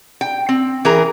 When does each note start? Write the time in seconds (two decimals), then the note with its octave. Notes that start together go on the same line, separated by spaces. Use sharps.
0.21 G5
0.49 C4
0.85 E3 G#4 A#4 A#5